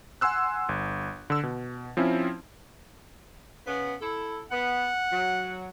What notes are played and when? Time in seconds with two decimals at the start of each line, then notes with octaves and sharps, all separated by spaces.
0.21 F#5 G#5 C6 E6 F#6
0.69 G1
1.30 D3 E6
1.43 B2
1.97 F3 C4 C#4 E4
3.66 C#3 B3
4.01 E4 A4
4.51 B3 F#5
5.12 F#3